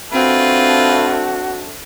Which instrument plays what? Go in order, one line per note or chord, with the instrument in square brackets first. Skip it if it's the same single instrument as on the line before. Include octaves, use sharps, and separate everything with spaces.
[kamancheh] A3 D4 [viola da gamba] C4 [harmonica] F4 B4 [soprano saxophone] F#4